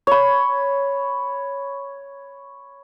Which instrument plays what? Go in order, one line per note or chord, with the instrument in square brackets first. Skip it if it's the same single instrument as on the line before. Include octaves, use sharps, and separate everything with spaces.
[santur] C#5 B5